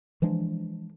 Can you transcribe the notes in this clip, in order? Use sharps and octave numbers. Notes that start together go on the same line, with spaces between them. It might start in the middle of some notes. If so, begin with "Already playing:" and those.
E3 F3 G#3 D4